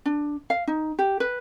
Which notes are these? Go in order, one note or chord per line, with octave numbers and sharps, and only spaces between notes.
D4
F5
D#4
G4
B4